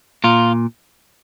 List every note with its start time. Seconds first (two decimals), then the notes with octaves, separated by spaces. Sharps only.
0.24 A#2 F4